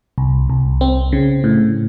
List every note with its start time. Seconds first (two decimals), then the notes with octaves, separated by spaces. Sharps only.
0.18 C2
0.50 C2
0.81 C4
1.12 C#3
1.44 A2